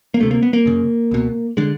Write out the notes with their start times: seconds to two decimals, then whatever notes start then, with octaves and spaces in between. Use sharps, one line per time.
0.14 A#3
0.20 D2 C3 A3
0.31 A#3
0.42 B3
0.53 A#3
0.65 F#2 C#3
1.11 C#2 B2
1.57 D3 G#3